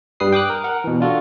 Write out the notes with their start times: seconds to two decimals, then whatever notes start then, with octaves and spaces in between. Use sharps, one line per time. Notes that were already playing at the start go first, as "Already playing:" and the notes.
0.20 G2 G3 B4 D#6 C7
0.32 G5 D6 D#6 F#6
0.50 A#4
0.64 A#4 F#5
0.84 B2 E3
1.00 D4 F4 F#4 A4